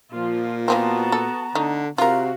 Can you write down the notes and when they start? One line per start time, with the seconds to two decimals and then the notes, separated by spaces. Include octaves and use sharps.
0.12 A#2 F3 F4
0.68 E3 F3 B3 C4 F#4 A5 A#5
1.12 A4
1.55 D3 A3 D#4
1.98 C3 F4 F#4 A#4 F5